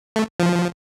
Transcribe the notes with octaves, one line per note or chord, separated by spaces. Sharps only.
A3
F3